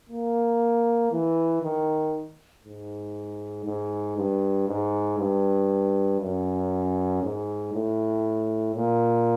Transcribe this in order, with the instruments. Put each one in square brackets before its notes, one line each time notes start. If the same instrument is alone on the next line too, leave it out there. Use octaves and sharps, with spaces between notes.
[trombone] A#3
E3
D#3
G#2
G#2
G2
G#2
G2
F#2
G#2
A2
A#2